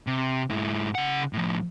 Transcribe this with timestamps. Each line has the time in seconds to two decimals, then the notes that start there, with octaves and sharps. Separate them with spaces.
0.07 C3
0.51 G#2 E4
0.95 C#3 F#5
1.33 A2 F3